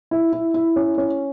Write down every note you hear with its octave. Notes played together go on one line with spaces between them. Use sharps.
E4
E4
E4
C#4
C#4